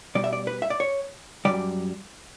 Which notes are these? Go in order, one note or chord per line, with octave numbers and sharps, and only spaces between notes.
B2 G3 D5
E5
D5
B4
E5
D5
C#5
F#2 C#3 G3 D5